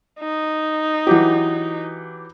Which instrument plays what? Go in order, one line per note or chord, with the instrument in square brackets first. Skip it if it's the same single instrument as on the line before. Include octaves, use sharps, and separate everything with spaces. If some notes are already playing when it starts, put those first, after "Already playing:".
[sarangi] D#4
[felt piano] E3 F#3 G4